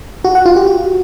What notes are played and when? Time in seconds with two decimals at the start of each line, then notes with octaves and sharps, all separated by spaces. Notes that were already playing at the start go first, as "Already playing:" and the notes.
0.24 F#4
0.35 F#5
0.46 F4
0.56 G4
0.67 F#4